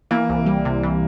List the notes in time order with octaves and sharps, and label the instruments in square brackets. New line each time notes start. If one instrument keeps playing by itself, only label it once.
[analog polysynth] E3 [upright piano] A#3
[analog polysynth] C2
G3
C3
E3